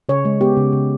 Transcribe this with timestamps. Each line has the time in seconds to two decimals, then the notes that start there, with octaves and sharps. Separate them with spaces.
0.09 C#3 C#5
0.25 G#3
0.41 B3 G4
0.57 C#3
0.73 C#3